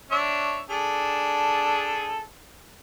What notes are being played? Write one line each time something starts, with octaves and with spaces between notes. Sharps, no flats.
D4 C#5 E5
D4 G#4 A4